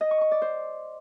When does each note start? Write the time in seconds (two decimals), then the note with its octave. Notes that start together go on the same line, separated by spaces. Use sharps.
0.01 D#5
0.11 C#6
0.21 C#6
0.31 D5
0.42 C5